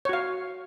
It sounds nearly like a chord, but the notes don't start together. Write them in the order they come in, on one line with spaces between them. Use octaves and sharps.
C#5 F#4 F5